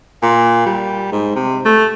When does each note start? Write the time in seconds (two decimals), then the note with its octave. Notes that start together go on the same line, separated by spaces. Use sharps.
0.23 A#2
0.66 G3
1.12 G#2
1.36 C3
1.65 A3